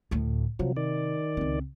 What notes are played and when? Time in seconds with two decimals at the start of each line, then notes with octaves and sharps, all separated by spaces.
0.11 D2 A2
0.59 C3 F3 F#3
0.77 D#3 D5
1.37 C#2 C4